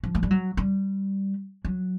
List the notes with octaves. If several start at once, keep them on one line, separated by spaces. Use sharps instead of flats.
F3
G#3
G3
F#3
G3
F#3